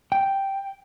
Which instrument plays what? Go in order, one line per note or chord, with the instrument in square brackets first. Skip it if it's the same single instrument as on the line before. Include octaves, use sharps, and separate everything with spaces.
[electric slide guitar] G5